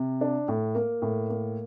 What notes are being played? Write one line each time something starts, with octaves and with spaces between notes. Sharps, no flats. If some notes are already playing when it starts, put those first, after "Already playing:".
Already playing: C3
D4
A2
A#3
A2
A#3